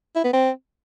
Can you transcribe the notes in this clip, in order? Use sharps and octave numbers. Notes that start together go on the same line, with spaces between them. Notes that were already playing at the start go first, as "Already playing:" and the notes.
E4
B3
C4